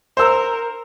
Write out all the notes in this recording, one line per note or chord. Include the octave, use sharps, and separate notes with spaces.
A#4 C5 E6